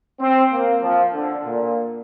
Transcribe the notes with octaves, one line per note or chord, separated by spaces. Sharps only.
C4
A#3
F3
D3
A#2